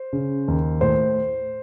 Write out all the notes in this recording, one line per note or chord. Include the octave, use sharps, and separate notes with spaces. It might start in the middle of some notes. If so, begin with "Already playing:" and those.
Already playing: C5
C#3
D#2
A2 C5